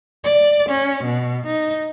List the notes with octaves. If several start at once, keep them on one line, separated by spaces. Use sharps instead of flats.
D5
C#4
B2
D#4